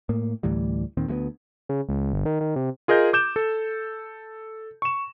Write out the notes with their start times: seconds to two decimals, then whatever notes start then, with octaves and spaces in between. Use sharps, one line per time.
0.09 A2 A#3
0.43 D2 A2 E3 G3
0.97 D#2 A#2 D#3 C4
1.08 D2 G#3 B3
1.69 C#3
1.89 C#2
2.13 G1
2.26 D#3
2.41 D#3
2.56 C3
2.88 F4 G#4 A#4 D#5 G6
3.13 D6 G6 E7
3.36 A4
4.82 C#6 E7